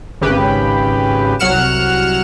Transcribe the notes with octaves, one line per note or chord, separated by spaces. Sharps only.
G#1 C#3 G4 B4
C2 F#3 F#5 F6 C#7 E7